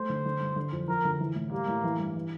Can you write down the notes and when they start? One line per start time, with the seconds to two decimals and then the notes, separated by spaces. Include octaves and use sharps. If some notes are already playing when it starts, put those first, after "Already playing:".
Already playing: A3 C5
0.09 D3
0.25 D3
0.40 G2
0.56 D3
0.72 F2
0.88 F3 A#4
1.05 D3
1.20 E3
1.35 A2
1.52 G3 A#3
1.68 A2
1.84 E3
1.99 G2
2.15 E3